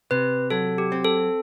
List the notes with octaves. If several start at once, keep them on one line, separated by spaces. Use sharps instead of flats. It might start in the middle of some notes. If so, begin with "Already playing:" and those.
C3 B4
F#3 A4
G4
C4
A4